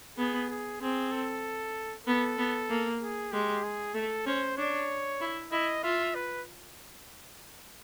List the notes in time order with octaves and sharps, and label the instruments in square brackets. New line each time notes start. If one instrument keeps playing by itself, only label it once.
[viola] B3 [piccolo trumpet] G#4
[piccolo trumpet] G#4
[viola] C4 [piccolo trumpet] G#4
[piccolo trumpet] A4
[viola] B3 [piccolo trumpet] A4
[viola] B3
A#3
[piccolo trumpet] G#4
[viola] G#3 [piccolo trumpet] G4
[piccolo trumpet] G#4
[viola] A3 [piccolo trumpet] A4
[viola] C#4 [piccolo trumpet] C5
[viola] D4 [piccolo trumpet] C#5
[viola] E4
[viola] E4 [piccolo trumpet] D#5
[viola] F4 [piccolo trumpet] E5
[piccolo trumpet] B4